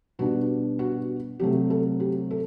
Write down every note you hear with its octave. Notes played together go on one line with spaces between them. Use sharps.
B2 G3 B3 D4 F#4
F#4
C3 F#3 A3 G4
A4
G4
A4